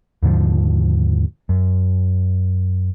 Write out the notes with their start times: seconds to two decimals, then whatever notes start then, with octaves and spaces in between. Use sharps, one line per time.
0.23 D#2 G#2 D3 F3
1.49 F#2